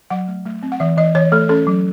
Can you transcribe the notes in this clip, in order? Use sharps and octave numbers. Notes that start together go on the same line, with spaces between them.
F#3 F#5
A3
A3
C4
F#5
E3 E5
E3 D#5
E3 C#5
A3 A4
C#4 A4
F#3